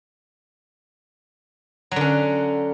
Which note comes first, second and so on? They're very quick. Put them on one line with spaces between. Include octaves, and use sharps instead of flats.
F#3 D3 C#4